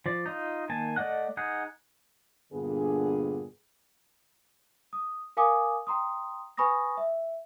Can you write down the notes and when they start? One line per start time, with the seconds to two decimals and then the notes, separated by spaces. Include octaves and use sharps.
0.06 F3 D5
0.26 D#4 F4
0.69 D#3 A#3 G#5 A5
0.96 A3 D5 D#5 F#5 F#6
1.37 D#4 G#4 F#5
2.53 G2 A#2 D3 B3 G#4
4.93 D#6
5.37 A#4 F5 G#5 D6 D#6
5.87 G5 A#5 C6 D#6
6.57 B4 G#5 B5 C#6 D#6 A#6
6.97 E5